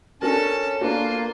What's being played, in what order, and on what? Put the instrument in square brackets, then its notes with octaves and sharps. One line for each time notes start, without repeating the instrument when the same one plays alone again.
[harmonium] C#4 [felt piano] D4 F#4 A#4 [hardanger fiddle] A4 A5
[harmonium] A#3 [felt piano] B3 D4 F#4 [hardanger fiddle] F4